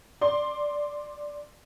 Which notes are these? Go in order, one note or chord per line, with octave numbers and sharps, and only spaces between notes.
D5 C6